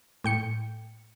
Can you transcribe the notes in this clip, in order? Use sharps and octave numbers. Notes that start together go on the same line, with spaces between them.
A2 G5 C#7